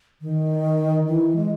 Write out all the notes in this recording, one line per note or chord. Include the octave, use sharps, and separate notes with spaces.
D#3
E3
G#3